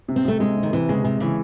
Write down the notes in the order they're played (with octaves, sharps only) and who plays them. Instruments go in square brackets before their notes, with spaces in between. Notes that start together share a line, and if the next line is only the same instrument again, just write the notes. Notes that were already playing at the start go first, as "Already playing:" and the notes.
[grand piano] C3
[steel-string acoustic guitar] C4
[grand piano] C3 [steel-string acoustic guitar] A3
[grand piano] C3 [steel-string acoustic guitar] G#3
[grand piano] C3
[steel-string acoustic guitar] D#3
[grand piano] C3 [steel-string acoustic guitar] E3
[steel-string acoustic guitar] C#3 [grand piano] G#3
[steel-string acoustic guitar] C3 [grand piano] G#3
[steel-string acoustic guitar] C#3 [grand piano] E3